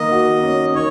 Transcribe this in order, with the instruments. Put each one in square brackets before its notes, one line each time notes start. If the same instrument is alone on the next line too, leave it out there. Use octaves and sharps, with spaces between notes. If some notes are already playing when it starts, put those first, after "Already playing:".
Already playing: [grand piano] D#3 A#3 [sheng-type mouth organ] D#5
[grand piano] F#4
C#4
[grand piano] D#3 [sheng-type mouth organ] C#5